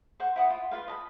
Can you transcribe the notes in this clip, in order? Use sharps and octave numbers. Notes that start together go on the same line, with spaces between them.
C5 F#5 C#6
E4 F#5 D#6
F4
F4 B4 F5
D#5 A5 B5